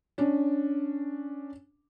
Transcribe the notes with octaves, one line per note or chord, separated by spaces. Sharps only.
C#4 D4